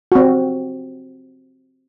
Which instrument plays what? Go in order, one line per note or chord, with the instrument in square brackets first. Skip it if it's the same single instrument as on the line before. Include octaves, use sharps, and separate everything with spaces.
[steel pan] C4 F#4